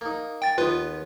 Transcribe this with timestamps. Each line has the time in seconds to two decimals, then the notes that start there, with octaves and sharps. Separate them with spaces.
0.01 A#3 D#4
0.42 G5 A6
0.58 D#2 B3 F4 B4